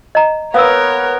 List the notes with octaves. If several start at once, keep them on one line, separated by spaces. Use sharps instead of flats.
D#5 A#5
B3 A#4 C#5 F5 D#6 E6